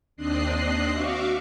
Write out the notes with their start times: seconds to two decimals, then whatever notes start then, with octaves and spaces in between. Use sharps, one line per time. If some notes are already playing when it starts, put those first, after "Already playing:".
0.17 D#2 C4 D4 D#5 F#6 C7
0.94 F#4 E5 F5 C#6 D6